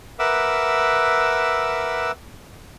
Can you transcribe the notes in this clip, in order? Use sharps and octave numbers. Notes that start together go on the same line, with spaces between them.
A#4 B4 E5 F#5 D6 E6